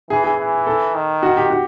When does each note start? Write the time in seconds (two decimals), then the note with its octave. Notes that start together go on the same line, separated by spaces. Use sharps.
0.10 E3 G#4
0.24 G#4
0.38 E3
0.67 A4
0.94 D#3
1.23 F#4
1.37 G4
1.50 F#4